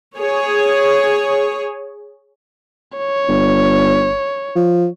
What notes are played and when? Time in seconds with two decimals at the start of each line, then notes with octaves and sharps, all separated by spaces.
0.16 G#4 C#5
2.98 C#5
3.29 G1
4.56 F3